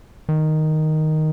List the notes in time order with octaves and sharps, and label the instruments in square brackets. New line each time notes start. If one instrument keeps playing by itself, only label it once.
[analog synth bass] D#3